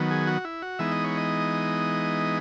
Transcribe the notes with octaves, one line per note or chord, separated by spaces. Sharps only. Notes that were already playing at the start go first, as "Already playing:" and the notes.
Already playing: D#3 F#3 B3
G#4
F#4
E4
F#4
E3 G#3 B3 D#4 E5
D#5
C#5
D#5